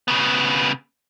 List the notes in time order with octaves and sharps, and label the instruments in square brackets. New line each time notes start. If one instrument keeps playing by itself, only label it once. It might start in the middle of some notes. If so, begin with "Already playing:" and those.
[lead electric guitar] C#3 B3